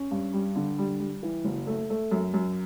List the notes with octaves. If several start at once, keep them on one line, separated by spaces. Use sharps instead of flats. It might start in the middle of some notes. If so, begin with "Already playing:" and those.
Already playing: C#4
G2
G3
D3
G3
G3
E3
F#1
A3
A3
F#2
F#2